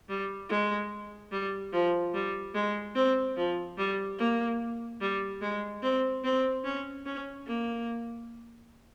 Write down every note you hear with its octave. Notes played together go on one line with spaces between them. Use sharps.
G3
G#3
G3
F3
G3
G#3
C4
F3
G3
A#3
G3
G#3
C4
C4
C#4
C#4
A#3